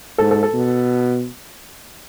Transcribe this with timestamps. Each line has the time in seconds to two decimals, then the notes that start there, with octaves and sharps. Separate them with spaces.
0.18 G#2 A4
0.31 A4
0.43 A4
0.54 B2